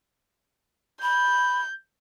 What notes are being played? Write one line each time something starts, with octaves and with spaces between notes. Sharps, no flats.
B5 G6